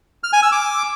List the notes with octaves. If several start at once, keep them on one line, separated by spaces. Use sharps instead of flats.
F6
G#5
E6
D6